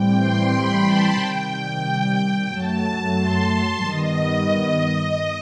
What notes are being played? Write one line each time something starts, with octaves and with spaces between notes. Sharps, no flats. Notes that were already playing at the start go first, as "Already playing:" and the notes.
Already playing: A2 E3 G3 C4 G5
C6
B5
A5
C3 D#3 G3 G5
G5
G5
F#2 F#3 A3 A5
C6
G2 D#3 G3 B3 D#5